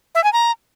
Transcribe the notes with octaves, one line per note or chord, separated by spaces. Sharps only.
E5
G#5
A#5